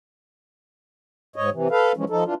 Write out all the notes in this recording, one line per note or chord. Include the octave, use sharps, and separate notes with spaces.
G#2 C#5 D#5
C3 E3
A4 B4 F5
E3 F3 G#3 C#4
F3 D#4 A4
E3 D4 F4